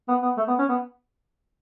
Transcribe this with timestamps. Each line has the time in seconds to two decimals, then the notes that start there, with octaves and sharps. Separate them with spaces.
0.08 B3
0.22 B3
0.37 A3
0.48 B3
0.59 C#4
0.69 B3